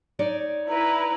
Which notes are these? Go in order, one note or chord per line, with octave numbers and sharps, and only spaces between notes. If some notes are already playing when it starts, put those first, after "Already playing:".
D#4 C#5 D5
E4 B4 A#5